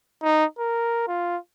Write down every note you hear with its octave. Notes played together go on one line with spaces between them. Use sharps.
D#4
A#4
F4